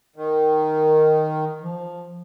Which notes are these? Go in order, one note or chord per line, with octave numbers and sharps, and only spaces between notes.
D#3
F3